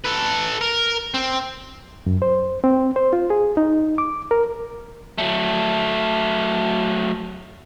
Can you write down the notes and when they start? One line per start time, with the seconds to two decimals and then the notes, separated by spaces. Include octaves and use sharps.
0.04 A4 B4
0.61 A#4
1.14 C4
2.06 F#2
2.22 C5
2.64 C4
2.96 C5
3.13 F4
3.30 G#4
3.57 D#4
3.98 D6
4.31 A#4
5.18 F#3 A3